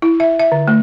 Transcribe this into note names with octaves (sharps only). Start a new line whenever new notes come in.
E4
E5
E5
D3
A3